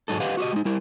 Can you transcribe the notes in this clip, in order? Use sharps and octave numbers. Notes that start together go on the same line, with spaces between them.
G#2 F#3 G#3 D#4 A4
G4 B4 D#5 F5 F#5
F#4 G4 C5 D#5
G#3 D#4
G3 E4 A#4